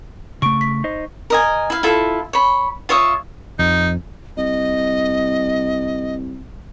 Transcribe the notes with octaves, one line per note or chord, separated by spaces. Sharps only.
C#3 A3 C#6 D7
B6
D#4 C5 D#5
A#4 D#5 G#5
E4 F5
E4 F4 A4
C#5 B5
F4 C#5 E5 D#6
F2 D#4
C2 D#5